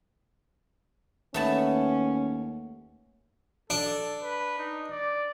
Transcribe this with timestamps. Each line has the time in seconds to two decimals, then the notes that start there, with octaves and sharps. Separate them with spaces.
1.34 D#2 A3 B3 C#4 A5
3.70 D4 A4
4.22 B4
4.59 D#4
4.91 D5